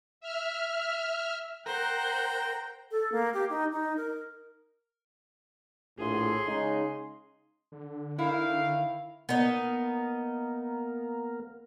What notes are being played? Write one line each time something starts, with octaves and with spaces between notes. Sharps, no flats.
E5 F6
A#4 C5 F#5 G5 A#5
A4
A#3
G4
D#4
D#4
A#4
A#1 A2 G#4 C6
C#3 G#3 D#4
D3
D#3 E4 F5
A#3 B3 D#4 A#4